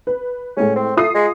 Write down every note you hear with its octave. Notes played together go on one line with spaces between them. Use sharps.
B4
A2 G#3 C#4
C4
A3 F4 D#6 C7
G#3